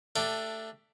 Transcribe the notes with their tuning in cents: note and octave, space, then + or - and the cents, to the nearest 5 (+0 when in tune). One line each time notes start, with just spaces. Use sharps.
A3 +15 D4 +0 G4 +0